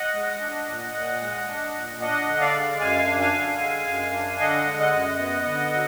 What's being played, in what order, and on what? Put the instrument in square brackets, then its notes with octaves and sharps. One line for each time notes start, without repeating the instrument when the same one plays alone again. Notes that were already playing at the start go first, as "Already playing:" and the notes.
Already playing: [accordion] D#5 F#5
G#3
D4
A#2
A#2
G#3
D4
A#2
D4 D#5 F#5
D3
D5 F5
G#3
F#2 F5 G#5
D4
F5 G#5
D3
G#3
F#2
D4
D3 D#5 F#5
G#3
D#5 F#5
F#2
B3
D3
F#3